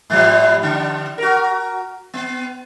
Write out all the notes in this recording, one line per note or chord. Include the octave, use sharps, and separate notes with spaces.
G#2 F3 G3
D3 D4
F#4 A#4
B3